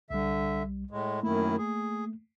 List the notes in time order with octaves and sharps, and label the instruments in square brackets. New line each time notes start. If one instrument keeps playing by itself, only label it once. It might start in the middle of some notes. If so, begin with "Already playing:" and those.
[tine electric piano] C2 G3 [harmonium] D3 E5
[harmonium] A2 G#3
[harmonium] F#2 D#3 E4 [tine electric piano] A3 A#3
[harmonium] G#4